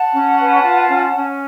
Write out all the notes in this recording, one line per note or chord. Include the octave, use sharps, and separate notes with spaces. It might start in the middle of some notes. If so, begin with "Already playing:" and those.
Already playing: F#5 A5
C#4
B4
F4
C#4
C#4